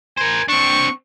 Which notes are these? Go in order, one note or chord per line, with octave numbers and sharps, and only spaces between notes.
A#4 C5 G#5
C4 D4 C#6